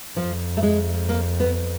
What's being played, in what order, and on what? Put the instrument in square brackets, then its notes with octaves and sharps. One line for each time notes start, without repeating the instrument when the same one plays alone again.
[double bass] F2 [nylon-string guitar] F3
[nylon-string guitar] A3
G#3
A#3
B3